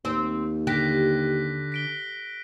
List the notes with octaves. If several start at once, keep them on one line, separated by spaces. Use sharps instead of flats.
D#2 C4 C5
D3 G4 F#6 A#6 B6
B6 D7 G7